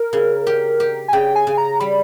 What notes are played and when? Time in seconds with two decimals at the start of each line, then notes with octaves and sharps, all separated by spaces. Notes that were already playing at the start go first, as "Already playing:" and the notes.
Already playing: A#4
0.13 C#3
0.47 G4
0.80 G4
1.08 G#5
1.13 C#3 G5
1.36 G#5
1.47 C#3
1.58 A#5
1.80 G3 B5